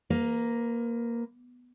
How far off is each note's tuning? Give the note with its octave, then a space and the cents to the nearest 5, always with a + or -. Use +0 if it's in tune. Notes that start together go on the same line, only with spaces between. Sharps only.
A#3 +0 B4 +35